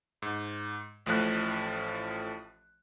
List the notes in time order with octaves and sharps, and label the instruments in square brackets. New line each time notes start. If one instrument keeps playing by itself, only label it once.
[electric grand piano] G#2
A1 A2 F3 A3 F#6